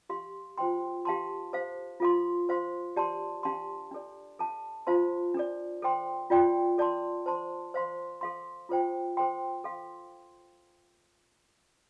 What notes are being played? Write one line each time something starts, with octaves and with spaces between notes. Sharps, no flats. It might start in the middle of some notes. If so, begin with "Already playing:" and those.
G4 F5 C6
F4 C5 G5 C6
G4 F5 A5 C6
A4 C5 F5
F4 A4 F5 C6
C5 F5 C6
G4 D5 A5 C6
D4 G4 F5 A5 C6
D4 A4 D5
A4 F5 A5
F4 C5 F5 A5 C6
D4 A4 D5
A4 C5 G5 C6
F4 D5 G5 C6
A4 D5 A5 C6
C5 A5 C6
C5 F5 C6
A4 F5 C6
F4 A4 C5 G5
A4 C5 G5 C6
A4 F5 C6